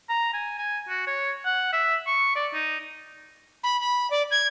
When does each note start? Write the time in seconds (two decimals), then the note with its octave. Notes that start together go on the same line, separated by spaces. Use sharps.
0.09 A#5
0.34 G#5
0.58 G#5
0.89 F#4
1.07 C#5
1.45 F#5
1.73 E5
2.07 C#6
2.36 D5
2.54 D#4
3.63 B5
3.81 B5
4.11 D5
4.31 G#6